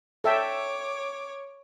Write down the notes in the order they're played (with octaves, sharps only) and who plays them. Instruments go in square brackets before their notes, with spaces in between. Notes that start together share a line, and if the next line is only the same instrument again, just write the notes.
[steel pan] A4 E5 G5 [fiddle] C#5 D6